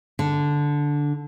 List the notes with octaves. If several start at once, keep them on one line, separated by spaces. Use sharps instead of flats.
D3